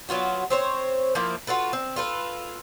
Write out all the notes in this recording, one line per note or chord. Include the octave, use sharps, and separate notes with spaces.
F#3 B3 F4 F#4
C4 C5 C#5
F3 A#3 E4
F4 F#4 A4 B4
C4
F4 A4 B4